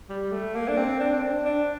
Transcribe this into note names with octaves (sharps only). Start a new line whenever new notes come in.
G3
A3
A#3
D4
C4
D4
C4
D4
D4